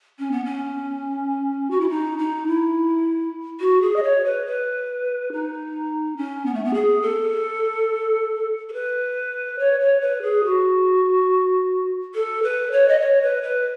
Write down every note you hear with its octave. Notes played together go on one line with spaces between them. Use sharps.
C#4
B3
C#4
F#4
E4
D#4
D#4
E4
F#4
G#4
D#5
C#5
B4
B4
D#4
C#4
B3
A3
B3
G#4
A4
A4
B4
C#5
C#5
B4
G#4
F#4
A4
B4
C#5
D#5
C#5
B4
B4